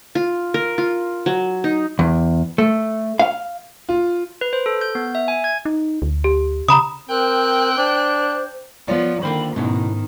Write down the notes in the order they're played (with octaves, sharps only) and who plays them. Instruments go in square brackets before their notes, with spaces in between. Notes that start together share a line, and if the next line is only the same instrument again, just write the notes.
[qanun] F4
A#4
F4
F#3
D#4
[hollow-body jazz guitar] E2
A3
F5
[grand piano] F4
[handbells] B4
C5
A4
G6
B3
E5
G#5
G#6
[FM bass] D#4
D2
[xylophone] G4
[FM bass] C#3 [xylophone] A#5 B5 D#6
[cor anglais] C4 [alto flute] A#4 [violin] G5 F#6
[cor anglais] D4 [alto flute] C5
[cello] F3 [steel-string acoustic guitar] B3 F4 C#5 [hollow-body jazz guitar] D5
[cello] D3 [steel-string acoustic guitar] D#3 A#3 F4 [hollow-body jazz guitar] C5 G5 [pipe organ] B5
[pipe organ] G#2 [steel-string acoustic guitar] B2 [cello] D#3 [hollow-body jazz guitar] A3 C#4 E4